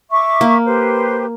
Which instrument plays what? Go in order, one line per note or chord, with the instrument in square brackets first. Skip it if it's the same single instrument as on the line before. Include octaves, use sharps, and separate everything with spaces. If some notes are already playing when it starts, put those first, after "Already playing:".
[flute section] E5 C#6 D6
[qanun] A#3
[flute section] G4 B4 C5